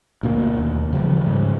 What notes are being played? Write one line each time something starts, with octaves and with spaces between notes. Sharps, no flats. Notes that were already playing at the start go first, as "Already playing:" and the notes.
D2 B2 A#3
D#2
C#3 E3 F3 G3
G#2 C#3